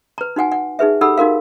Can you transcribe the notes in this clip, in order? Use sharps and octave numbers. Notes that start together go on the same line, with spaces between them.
B4 A#5
D#4 F#4 F#5 G#5
F#5
D#4 G#4 B4 E5
D#4 G4 A4 F#5 B5 E6
D#4 F#4 A#4 F5